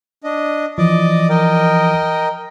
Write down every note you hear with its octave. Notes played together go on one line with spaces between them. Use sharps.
D4 D#5
E3 F3 D5 D#5 D6
A#4 D#5 G5